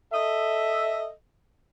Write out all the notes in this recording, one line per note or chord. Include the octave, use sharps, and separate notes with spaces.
A4 D#5 E5